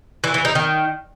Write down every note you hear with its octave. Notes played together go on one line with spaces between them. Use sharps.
E3
E3
D#4
D#3